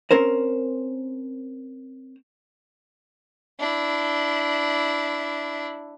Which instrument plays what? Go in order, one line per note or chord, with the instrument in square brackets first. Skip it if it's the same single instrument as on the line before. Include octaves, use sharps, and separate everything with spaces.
[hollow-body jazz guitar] C4 C#4 A#4 C5
[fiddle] D4 E4